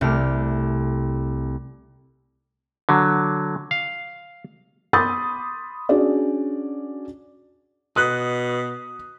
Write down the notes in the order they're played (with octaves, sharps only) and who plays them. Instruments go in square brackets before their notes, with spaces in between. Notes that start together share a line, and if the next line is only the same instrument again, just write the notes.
[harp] C2 C3 A3 D6 F6
[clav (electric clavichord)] D3 F#3
F5
[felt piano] B5 C6 D6 D#6 G6 A6
C#4 D4 F#4 G#4 D5
[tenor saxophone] B2 [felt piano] D#6 F#6